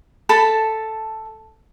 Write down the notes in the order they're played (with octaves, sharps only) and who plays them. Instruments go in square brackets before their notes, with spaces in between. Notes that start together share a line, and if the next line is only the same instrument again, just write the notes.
[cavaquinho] A4 A5 B5